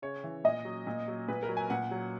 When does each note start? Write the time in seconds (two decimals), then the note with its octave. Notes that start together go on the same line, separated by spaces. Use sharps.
0.02 C#3 C#5
0.24 E3
0.44 A#2 D#5
0.65 F#3
0.87 A#2
1.08 F#3
1.28 A#2 B4
1.43 A#4
1.49 F#3
1.57 G#5
1.70 A#2 F#5
1.91 F#3